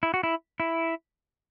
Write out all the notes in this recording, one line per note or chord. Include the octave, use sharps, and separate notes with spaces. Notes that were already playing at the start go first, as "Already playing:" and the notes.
E4
F#4
E4
E4